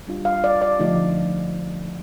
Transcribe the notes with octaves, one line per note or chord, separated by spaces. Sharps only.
G3 D4 F4
F5
D5
D5
D3 F3 A3 D#4